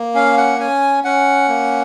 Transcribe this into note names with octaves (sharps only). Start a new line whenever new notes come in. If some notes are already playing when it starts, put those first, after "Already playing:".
Already playing: A#3
C#4 F5
F#5
C#4 G#5
C#4 F#5
A#3